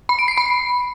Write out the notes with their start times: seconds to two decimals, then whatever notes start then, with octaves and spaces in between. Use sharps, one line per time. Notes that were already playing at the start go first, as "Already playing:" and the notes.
0.09 B5
0.19 D7
0.28 C7
0.37 B5